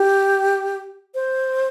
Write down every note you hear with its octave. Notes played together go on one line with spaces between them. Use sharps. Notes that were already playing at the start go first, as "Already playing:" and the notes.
Already playing: G4
C5